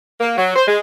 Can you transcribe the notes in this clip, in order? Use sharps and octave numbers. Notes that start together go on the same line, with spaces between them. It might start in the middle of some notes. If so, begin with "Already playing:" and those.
A#3
F#3
C5
G#3